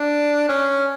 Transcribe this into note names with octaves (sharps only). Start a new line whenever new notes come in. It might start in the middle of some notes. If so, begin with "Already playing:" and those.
Already playing: D4
C#4